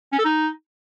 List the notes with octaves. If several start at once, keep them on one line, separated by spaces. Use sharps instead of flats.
C#4
A4
D#4